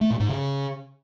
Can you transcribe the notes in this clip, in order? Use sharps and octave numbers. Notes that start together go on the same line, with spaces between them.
A3
A#2
G#2
C#3